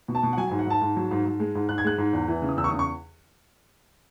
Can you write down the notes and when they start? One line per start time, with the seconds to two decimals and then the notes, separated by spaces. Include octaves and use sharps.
0.08 B2
0.15 A5
0.23 B2
0.33 F#5
0.37 F#3 G#5
0.48 G#2 G#5
0.59 F#5
0.67 G#2 A5
0.81 G#2
0.96 F#3
1.11 G#2
1.26 G#2
1.40 G#3
1.55 G#2
1.69 G#2 F#6
1.78 G#6
1.84 G#3 F#6
1.98 G#2
2.13 E2
2.28 E3
2.42 C#3
2.49 D#6
2.57 E2 E6
2.64 C#6
2.68 C#3 D#6
2.79 C#6